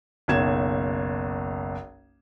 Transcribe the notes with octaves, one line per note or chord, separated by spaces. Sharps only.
F#1 B1 G#6 E7